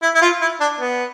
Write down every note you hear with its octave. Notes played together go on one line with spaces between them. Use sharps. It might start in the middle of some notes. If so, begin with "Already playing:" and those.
E4
E4
F4
E4
D4
B3